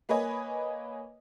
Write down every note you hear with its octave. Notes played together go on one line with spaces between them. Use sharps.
A#3 B4 C#5 D#5 G#5